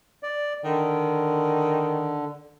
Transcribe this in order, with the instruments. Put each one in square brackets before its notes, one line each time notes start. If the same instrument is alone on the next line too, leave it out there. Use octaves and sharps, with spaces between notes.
[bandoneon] D5
[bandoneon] D3 [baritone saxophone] D#3